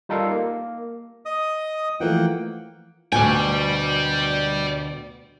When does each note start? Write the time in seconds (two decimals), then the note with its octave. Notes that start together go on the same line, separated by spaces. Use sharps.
0.09 G3 D#4 F4 A4 A#4 F5
0.31 A#3
1.25 D#5 D#6
2.00 E3 F3 A3 A#3 F#5 G5
3.12 D2 B2 D5 G5 G#5